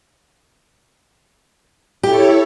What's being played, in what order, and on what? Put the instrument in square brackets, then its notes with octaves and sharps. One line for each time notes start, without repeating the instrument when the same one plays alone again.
[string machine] E4 A4 C#5 [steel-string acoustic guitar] G4